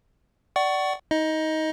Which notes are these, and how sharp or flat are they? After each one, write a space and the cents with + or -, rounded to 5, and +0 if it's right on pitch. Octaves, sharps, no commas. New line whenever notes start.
D5 +0 F#5 +30 C#6 +0
D#4 +25 D#5 +10